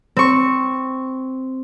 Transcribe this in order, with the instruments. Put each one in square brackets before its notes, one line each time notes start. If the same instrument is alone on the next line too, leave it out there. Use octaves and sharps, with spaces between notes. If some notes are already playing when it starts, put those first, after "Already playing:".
[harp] C4 C#6